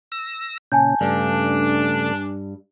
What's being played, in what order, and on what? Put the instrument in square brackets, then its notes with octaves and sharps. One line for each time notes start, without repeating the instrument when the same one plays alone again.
[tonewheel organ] E6 A#6
[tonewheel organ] A#2 C#3 C#4 [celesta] G#5 A5 G6
[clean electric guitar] G2 [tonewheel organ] C#3 A3 [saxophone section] D4